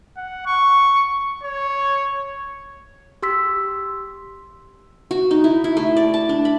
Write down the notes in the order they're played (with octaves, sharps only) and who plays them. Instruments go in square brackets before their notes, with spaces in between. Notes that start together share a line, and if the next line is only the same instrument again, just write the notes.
[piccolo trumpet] F#5
C#6
C#5
[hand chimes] G4 C6 E6 B6
[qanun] F#4
D#4
E4
E4
A3
D5
A5
D4
B5